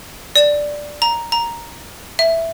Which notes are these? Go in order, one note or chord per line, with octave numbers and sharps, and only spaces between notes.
D5
A#5
A#5
E5